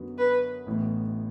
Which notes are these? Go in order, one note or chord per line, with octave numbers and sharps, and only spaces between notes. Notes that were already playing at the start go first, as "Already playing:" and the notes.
Already playing: F#2 D3 F#3 B3 F#4
B4
A1 A2 E3 B3